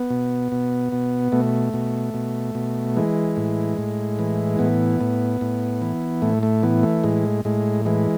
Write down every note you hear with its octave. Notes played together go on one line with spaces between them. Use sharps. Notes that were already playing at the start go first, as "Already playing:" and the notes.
Already playing: B3
B2
B2
B2
B2 A3
B2
B2
B2
E3 G#3
A2
A2
E3
A2 B3
A2
A2
E3
A2 A3
A3
E3 B3
A3
A2 G#3
A2 G#3
E3 G#3